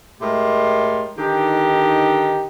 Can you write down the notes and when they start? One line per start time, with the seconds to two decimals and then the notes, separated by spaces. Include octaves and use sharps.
0.21 A2 G#3 G4 A#4 C6
1.18 D3 D#3 D#4 G4